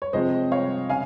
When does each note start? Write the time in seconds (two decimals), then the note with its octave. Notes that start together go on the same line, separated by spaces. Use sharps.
0.02 C#5
0.13 C3 F3 G#3 C4 C5 D#5
0.52 C#5 F5
0.89 C#3 F5 G#5